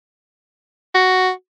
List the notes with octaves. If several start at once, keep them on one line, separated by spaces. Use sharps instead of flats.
F#4